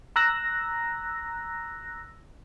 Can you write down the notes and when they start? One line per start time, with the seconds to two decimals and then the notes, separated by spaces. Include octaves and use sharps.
0.16 A#5 E6 F#6 A#6